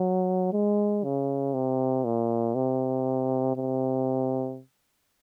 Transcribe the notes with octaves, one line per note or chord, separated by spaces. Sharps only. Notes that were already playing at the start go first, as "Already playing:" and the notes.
Already playing: F#3
G#3
C#3
C3
A#2
C3
C3